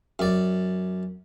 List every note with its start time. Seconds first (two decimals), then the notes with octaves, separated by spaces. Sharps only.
0.19 F#2 D5